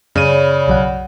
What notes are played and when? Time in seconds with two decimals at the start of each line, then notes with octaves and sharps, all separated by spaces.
0.16 F#2 C#3 C#5 D5 B5 D#7
0.68 B1 F#3 F#5